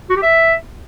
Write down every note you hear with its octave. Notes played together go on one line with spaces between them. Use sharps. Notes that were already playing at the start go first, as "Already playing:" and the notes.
F#4
G4
E5